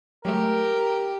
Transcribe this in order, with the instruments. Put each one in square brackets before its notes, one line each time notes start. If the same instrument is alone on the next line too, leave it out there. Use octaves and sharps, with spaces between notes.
[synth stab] F#3 G#3 A3 [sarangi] G4 [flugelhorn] A#4